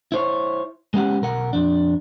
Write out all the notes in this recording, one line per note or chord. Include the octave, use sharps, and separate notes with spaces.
E4 C5 C#5
G#3 B3 C#4 G4 F#5
B1 A#4 F#5
F2 D4